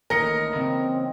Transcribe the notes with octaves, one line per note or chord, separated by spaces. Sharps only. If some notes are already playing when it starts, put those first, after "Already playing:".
A1 D#3 A#3 D#4 A#4 D#5 A#6 C#7
C#3 E3 F#3 C4